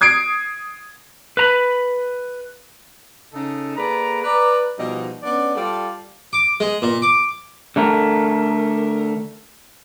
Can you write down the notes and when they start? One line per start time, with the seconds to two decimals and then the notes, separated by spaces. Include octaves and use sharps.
0.01 D#6 G#6 C7 D7
1.37 B4 A#5 B5
3.34 C#3 D#4 A4
3.76 A#3 G#4 A4 B4 D5 A#5
4.24 B4 D5 A#5
4.78 B2 F3 G3 D#4
5.23 B3 C#4 D4 D5
5.55 G3 F4 A4 D5 F5 A5
6.33 D6
6.60 G#3
6.82 A#2
7.02 D6
7.76 D3 A3 A#4